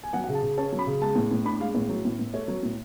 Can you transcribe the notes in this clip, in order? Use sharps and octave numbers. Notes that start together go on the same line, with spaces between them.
G#5
F#3 F#5
F#5
C#3
A5
C#3
C#4 A5
F#3
B5
C#3
G#3 A5
A2
A2
D4 B5
G#3 F5
A2 C#5
F#3
A2
A2
A3 C#5
F#3
A2